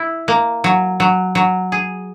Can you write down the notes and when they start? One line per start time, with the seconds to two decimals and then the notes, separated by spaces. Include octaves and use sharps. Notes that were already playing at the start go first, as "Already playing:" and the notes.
Already playing: E4
0.28 A#3
0.64 F#3
1.00 F#3
1.35 F#3
1.72 G#4